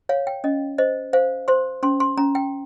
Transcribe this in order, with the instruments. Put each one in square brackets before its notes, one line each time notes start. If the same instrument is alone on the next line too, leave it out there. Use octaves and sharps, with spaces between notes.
[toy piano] C#5 F5
G5
C#4 D#5
C5 D#5
C5 F5
C5 C6
C#4 C6
C6
C#4 A#5
G5